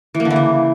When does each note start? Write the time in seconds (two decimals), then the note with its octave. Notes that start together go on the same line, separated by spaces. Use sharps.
0.15 E3
0.20 A#3
0.25 D3
0.31 E3
0.36 C#3